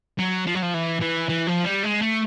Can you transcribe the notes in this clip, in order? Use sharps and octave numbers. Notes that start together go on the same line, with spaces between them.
F#3
F3
F#3
F3
E3
E3
E3
F3
G3
G#3
A3